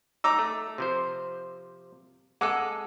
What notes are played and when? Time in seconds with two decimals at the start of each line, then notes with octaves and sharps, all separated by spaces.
0.24 D#4 A#5 D6 E6
0.39 A3
0.78 C3 F3 C5
2.41 G#3 G#4 A4 F#5 D6 E6